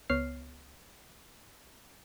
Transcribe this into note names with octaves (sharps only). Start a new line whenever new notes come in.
C#2 B3 C#5 F6 C7